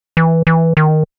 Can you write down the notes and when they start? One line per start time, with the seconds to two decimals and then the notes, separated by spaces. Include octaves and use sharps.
0.17 E3
0.47 E3
0.77 D#3